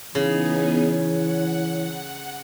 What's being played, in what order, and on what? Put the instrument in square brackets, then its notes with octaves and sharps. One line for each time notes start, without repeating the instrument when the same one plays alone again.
[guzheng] C#3 [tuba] E3 [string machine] B3 D#4 G#4 [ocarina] C#5
[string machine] F#5